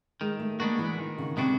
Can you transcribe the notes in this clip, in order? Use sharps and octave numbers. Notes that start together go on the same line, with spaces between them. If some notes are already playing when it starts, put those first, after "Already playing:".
D#3 G#3
A3
G#3 A#3 B3 D4 F#4
E3
D#3
C#3
C3 G#3 B3 D4 F#4